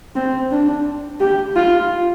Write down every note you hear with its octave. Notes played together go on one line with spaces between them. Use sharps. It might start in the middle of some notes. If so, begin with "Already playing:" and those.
C4
D4
G4
F4